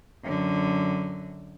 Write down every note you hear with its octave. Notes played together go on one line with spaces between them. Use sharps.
F#2 D3